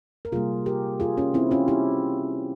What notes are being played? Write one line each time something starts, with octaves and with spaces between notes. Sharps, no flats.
A#4
C3 G3 A#3 F4 G#4
G4 A#4
F4 G#4
C#4 F4
C4 E4
C#4 F4
E4 G4